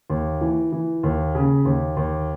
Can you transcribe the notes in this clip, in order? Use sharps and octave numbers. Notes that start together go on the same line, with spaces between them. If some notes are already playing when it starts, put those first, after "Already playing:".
D#2
E3
E3
D#2
C#3
D#2
D#2